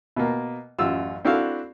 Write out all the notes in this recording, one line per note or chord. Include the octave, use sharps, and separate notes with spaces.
B2 A#3
A1 F#2 F4 E6
C4 D4 E4 F#4 A4 F5